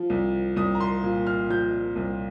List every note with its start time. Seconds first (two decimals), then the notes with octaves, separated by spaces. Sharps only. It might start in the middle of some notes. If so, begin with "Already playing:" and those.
Already playing: F3
0.10 C2
0.56 C2 D#6
0.75 A#5
0.81 C6
1.03 A#2
1.27 F6
1.50 F3 G6
1.96 C2